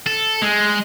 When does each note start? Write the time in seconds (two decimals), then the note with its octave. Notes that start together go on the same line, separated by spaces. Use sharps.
0.07 A4
0.42 G#3